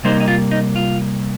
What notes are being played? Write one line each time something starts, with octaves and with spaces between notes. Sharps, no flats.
C3 G3 A#3 D#4 C5
D#4
F4
D#4
F4